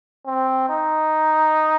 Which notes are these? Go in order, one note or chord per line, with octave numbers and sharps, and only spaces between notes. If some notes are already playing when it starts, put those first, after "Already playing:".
C4
D#4